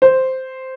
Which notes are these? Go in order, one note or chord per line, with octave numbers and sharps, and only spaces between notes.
C5